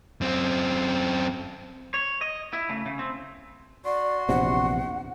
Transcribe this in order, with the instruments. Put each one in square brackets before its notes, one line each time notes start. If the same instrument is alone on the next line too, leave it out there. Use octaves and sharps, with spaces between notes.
[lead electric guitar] F#2 C4
C#5
D#5
E4
C#3 A3
C#3
C4
[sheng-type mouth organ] F#4 C6 [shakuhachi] D5
[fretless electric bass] A#1 E2 C3 [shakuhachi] F#5